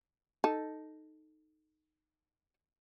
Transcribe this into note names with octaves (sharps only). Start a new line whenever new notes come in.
D#4 A4